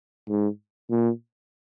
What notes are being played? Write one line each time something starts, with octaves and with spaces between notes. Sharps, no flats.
G#2
A#2